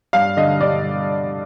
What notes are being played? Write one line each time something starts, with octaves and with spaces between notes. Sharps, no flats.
G2 F5
D3 D#5
G2 D5